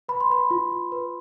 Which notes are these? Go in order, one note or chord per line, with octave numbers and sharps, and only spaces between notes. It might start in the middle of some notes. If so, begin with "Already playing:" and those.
B4 B5
C6
B4 B5
F4
F4
B4